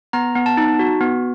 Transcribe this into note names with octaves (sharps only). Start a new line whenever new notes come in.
B3 A#5
B3
A5
D#4
F#4
B3